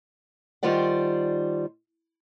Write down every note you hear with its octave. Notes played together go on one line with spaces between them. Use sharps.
D#3 G3 F4 C5 D5 F#5